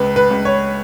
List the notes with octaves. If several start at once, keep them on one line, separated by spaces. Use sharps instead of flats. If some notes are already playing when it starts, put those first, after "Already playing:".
Already playing: C#2 B4
B4
C#2
C#5